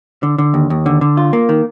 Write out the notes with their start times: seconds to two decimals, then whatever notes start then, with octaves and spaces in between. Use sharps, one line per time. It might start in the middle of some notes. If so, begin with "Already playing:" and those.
0.23 D3
0.38 D3
0.54 D#2
0.70 D#2
0.86 D3
1.01 D3
1.17 F4
1.33 A#3
1.49 D#3